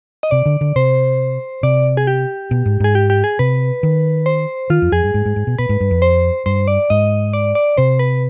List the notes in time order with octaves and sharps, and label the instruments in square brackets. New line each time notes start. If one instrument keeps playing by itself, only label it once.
[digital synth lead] D#5
[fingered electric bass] C3 [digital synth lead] D5
[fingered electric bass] D3
D3
[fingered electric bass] C3 [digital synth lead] C5
[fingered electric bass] C3 [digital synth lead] D5
[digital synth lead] G#4
G4
[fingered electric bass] B2
G#2
[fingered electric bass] G#2 [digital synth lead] G#4
[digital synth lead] G4
G4
G#4
[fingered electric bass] C3 [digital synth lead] B4
[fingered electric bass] D#3
[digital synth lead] C5
[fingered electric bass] D#3 [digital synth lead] F4
[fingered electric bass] F2
[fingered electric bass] F2 [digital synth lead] G#4
[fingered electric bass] G2
G#2
G#2
G#2
B2
[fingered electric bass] B2 [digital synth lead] B4
[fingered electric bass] G#2
G2
F2
[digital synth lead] C5
[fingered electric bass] G2 [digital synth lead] C5
[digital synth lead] D5
[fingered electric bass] G#2 [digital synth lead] D#5
[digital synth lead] D5
D5
[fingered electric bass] C3 [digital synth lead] C5
[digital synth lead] B4